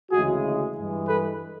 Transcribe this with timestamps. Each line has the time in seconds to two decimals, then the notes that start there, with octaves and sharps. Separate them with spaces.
0.11 D2 C#3 E3 G#3 F#4 G#4
0.76 G2 E3 G#3
1.07 A4 B4